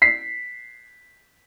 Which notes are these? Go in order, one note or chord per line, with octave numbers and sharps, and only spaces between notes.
B6 C7